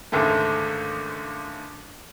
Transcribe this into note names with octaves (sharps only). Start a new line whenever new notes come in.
C#2 G#2 D3 D#3 A3